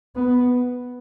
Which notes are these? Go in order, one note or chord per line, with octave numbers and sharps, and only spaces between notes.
B3